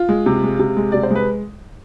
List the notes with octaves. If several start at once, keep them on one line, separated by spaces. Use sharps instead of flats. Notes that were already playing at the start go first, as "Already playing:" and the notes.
Already playing: F4
G#3
C3
G#3
C3
G#3
C3 D5
C5
G#3 B4